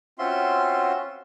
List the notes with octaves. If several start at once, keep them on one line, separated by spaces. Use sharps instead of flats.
C4 C#4 F4 F#4 E5 C6